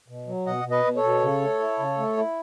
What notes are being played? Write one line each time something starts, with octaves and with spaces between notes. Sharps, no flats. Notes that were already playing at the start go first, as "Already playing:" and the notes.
B2
F#3
B2 D#5 F#5
B2
B4 D#5
B2
A4 C#5
B2
C#3
A3
E4
C#3
A3
E4